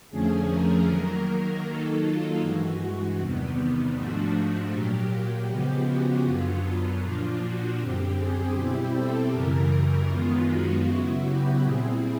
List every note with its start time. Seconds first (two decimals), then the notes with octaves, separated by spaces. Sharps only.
0.10 F2 D3 F3 A3 C#4 G#4
0.48 A#4
0.87 D#3 F#3 A#3
1.64 D#3 F#3 A#3 D#4 A4
2.02 F4
2.40 G2 E3 G#3 F#4
3.18 E2 C3 D#3 G3 B3
3.94 G#2 F3 A3 D4 F#4
4.71 A#2 F#3 A#3 G4
5.09 G4
5.48 C#3 F3 G#3 B3
5.86 F#4
6.24 F#2 D3 F#3 B3 F4
7.01 A#2 F3 A#3 D4 F4
7.39 F#4
7.78 F#2 D3 G3 C4 G4
8.16 G#4
8.54 B2 G3 C4 E4 G4
8.93 A4
9.31 F#2 C#3 E3 G3 A#4
10.08 F#2 D#3 G#3 B3 F4
10.46 F#4
10.85 C#3 F#3 B3 E4
11.23 G4
11.62 A#2 G3 C4 E4 G#4